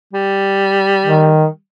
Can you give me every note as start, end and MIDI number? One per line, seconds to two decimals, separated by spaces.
0.13 1.58 55
1.06 1.46 51